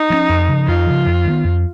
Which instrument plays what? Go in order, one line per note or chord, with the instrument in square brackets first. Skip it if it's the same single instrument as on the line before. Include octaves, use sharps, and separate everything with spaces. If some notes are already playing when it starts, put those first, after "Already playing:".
Already playing: [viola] D#4
[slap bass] F3 A#3 C#4
F2
C#3 F3
[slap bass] F2 [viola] F4
[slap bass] C#3 F3
F2
D#3 G#3
B3
F2